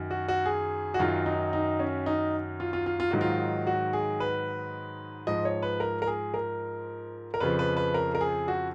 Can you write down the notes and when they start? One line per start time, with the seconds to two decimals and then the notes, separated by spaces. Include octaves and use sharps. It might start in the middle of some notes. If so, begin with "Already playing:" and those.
Already playing: F#2 D#3 F#3
0.11 F#4
0.28 F#4
0.46 G#4
0.94 F#4
0.99 F#2 D#3 F#3 F4
1.26 D#4
1.53 D#4
1.80 C#4
2.06 D#4
2.60 F4
2.73 F4
2.86 F4
3.00 F4
3.11 G#2 D#3 F#3 F#4
3.21 F4
3.67 F#4
3.93 G#4
4.20 B4
5.27 G#2 F3 D#5
5.45 C#5
5.63 B4
5.80 A#4
6.02 A#4
6.07 G#4
6.34 A#4
7.34 A#4
7.40 F2 C#3 F3 B4
7.59 B4
7.77 B4
7.94 A#4
8.15 A#4
8.21 G#4
8.48 F#4